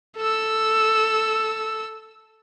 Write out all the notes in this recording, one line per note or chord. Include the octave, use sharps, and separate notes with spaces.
A4 E6